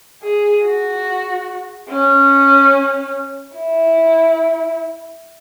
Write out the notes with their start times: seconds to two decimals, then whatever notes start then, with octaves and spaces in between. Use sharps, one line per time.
0.23 G#4
0.64 F#4
1.89 C#4
3.56 E4